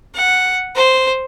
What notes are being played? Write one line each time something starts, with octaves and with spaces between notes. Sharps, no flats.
F#5
C5